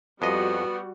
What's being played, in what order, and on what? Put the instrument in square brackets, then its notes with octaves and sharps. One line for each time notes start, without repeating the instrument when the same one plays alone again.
[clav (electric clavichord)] F2 D#5 [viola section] G3 F#4 [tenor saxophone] B3